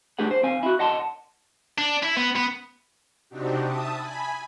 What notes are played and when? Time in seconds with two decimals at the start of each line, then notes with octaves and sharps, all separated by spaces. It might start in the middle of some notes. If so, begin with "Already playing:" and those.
0.19 A3 D4 G4 G#4 F#5
0.31 C5
0.43 C4 F5 G#5
0.63 E4 F#4
0.79 D#5 F#5 A5 C6
1.78 D4
2.03 E4
2.17 B3
2.36 B3
3.29 C3 C4 D4 D#4 F#4 G4
3.65 E5 A5 D#6
3.95 G#5 B5